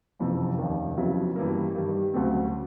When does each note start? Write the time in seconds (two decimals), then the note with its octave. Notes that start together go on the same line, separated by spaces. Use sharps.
0.19 F#1 F2 C3 E3
0.58 F1 D#2 D#3
0.97 F2 C#3 F#3 B3 E4
1.36 G2 E3 G3 A#3
1.75 G2 D#3 G3
2.14 D2 C#3 F#3 A3 C4